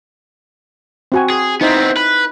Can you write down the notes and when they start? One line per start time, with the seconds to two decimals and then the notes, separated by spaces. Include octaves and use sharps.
1.12 C4 F#4 G#5
1.30 G#4
1.61 B3 C4 D#4 E4 C5
1.97 B4